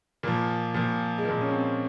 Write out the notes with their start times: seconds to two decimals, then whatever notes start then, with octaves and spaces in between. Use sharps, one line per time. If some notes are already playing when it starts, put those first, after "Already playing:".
0.23 A#2 F3 A#3
0.74 A#2 F3
1.18 G#3
1.25 F3 A#3
1.29 A#2
1.41 C#4
1.51 C4